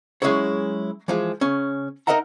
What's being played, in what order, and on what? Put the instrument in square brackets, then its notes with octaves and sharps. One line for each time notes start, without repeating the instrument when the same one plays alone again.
[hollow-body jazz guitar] F#3 G#3 C#4 E4 G#4 C#5
E3 F3 G#3
C#3 C#4
D#4 A#4 D#5 E5 F#5 A#5